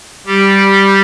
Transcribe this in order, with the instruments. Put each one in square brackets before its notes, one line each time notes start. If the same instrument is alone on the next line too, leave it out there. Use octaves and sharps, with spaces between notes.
[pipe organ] G3 G4